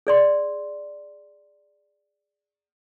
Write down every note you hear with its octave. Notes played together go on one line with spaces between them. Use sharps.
G#4 D5 C6